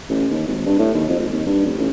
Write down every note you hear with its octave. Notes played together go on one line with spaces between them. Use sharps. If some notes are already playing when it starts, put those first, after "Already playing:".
A1
D#2
G#1
G2
A2
D#2
F2
G#1
D#2
G2
F1
A1